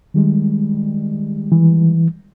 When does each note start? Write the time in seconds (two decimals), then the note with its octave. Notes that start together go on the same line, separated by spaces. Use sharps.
0.14 D#3 G3 G#3
1.52 E3